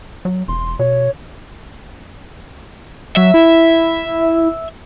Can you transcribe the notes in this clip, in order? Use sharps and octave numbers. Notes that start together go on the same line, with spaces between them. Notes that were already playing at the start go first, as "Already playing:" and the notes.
F#3
E1 C6
B2 C#5
F#3 E5
E4